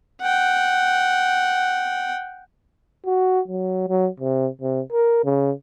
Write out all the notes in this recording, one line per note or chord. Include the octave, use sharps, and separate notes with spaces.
F#5 G5
F#4
F#3
F#3
C3
C3
A#4
C#3